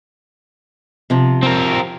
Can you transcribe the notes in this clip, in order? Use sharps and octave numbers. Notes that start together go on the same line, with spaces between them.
C3 F3
C4 A#4